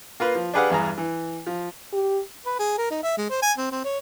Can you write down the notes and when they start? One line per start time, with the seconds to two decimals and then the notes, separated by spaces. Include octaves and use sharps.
0.20 A#3 F4 B4
0.35 F3
0.54 D4 G4 G#4 B4 F5 F#5
0.70 E2 G2 G#4 A#5
0.98 E3
1.47 F3
1.93 G4
2.46 B4
2.59 G#4
2.78 A#4
2.91 D#4
3.03 E5
3.18 G#3
3.30 C5
3.43 G#5
3.58 C4
3.72 C4
3.84 C#5